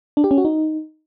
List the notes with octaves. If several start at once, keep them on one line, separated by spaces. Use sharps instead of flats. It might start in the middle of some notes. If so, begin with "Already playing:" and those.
D4
G4
C#4
F#4
D#4